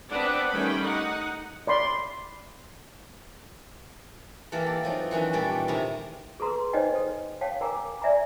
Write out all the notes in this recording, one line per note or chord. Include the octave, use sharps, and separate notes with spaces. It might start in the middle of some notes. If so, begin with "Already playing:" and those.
B3 C4 D4 B4 D5 F#5
D#3 G3 A3 C#4 G5 B5
D#4 F#5
D5 B5 C6
E3 A#3 G4 A4 A#4
A4
F3 F#3 C4 D#4
D#3 E3 C#4 D4
A#2 G3 A3 G4 A4 B5
C3 D#3 A3 E4 G#4 A#5
G#4 A4 B4 A#5 C6
D#4 C5 C#5 D#5 G5 G#5
A4 C5
C#5 F5 G5 A5
A#4 G5 G#5 A#5 D6
D5 E5 G#5 A#5